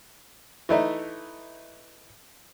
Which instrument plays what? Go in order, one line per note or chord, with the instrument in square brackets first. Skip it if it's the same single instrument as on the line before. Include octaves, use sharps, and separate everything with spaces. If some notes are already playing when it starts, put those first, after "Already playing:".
[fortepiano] E3 A3 D#4